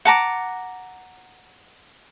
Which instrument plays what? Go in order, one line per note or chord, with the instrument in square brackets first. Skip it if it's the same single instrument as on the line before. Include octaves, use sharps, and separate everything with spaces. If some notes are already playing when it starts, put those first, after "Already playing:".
[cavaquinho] F#5 A5 A#5 D6